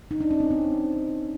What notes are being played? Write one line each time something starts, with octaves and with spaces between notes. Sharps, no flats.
D#4
D4
C#4
C4
C4